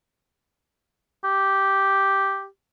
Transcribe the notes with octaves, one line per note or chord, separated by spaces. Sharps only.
G4